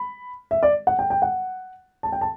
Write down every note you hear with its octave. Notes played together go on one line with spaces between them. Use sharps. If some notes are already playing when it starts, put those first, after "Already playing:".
Already playing: B5
E5
D5
F#5
G5
G5
F#5
A5
G5
A5